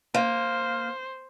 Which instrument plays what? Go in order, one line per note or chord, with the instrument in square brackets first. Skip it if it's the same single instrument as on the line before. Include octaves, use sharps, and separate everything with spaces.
[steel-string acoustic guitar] A#3 [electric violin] C5